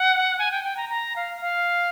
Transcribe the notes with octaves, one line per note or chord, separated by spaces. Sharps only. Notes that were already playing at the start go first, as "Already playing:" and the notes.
Already playing: F#5
G#5
G5
G5
A#5
A#5
F5
F5